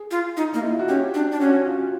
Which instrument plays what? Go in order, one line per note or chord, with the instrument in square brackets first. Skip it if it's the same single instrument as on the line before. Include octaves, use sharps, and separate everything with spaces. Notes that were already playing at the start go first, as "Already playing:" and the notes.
Already playing: [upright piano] G#4
[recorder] F4
D#4
[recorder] A#3 [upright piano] D#4
[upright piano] E4
F4
F#4
[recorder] C#4 [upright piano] G4
[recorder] D4
D4
[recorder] C#4 [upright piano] F#4
[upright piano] F4